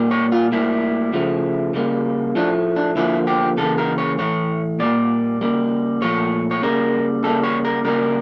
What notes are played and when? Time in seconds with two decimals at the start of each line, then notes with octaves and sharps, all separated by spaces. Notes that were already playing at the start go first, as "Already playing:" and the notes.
Already playing: A#2 G3 A#3
0.11 C#5
0.32 F4
0.52 A2 G3 A#3 E4
1.13 C#3 F3 A3
1.74 C#3 G3 A#3
2.35 A2 F3 A3 D4
2.76 D4
2.96 D3 F3 A#3 E4
3.27 G4
3.57 C#3 E3 G3 A#3 A4
3.78 A#4
3.98 C#5
4.19 A2 E3 A3 C#5
4.79 A#2 G3 A#3 D5
5.41 C#3 G3 A#3
6.02 A#2 F3 A3 C#5
6.51 C#5
6.62 C#3 G3 A#3 A#4
7.24 C#3 G3 A#3 A4
7.43 C#5
7.65 A#4
7.85 C#3 G3 A#3 A#4